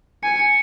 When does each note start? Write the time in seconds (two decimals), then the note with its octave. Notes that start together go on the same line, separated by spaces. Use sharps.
0.23 G#5 C#7
0.39 C#7